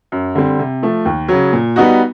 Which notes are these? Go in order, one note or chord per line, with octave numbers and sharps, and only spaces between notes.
F#2
D3 G3 C4
C3
F3 A3
D#2
C#3 F#3
A#2
G3 B3 D#4 F#4